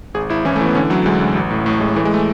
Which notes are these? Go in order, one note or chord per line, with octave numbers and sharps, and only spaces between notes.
G#1 G#4
G#1 E4
E3 C#4
A3
E3
B3
D3 C#4
D2 F#3
D2 G#3
D2
A1
A2
A2 A3
A1 G#3
E3 A3
G#3
A3